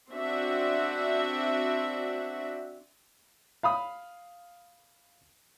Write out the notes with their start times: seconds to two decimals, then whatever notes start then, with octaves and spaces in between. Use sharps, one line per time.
0.11 C4 D4 F#4 E5
3.63 F5 B5 D#6